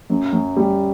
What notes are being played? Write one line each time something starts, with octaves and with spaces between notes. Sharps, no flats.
F#2
F#2
G3